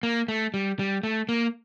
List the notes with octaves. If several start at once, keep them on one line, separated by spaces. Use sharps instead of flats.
A#3
A3
G3
G3
A3
A#3